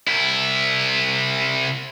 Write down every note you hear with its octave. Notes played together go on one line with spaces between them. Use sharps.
C2 E4